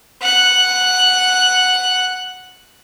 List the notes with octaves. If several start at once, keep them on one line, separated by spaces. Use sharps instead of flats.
F#5 F#6